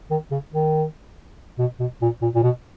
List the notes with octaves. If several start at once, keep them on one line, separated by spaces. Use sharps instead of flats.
D#3
C#3
D#3
B2
B2
A#2
A#2
A#2
B2